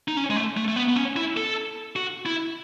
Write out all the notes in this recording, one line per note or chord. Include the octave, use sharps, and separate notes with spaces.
D#4
C#4
G#3
A3
A3
A3
B3
B3
C#4
E4
A4
F#4
E4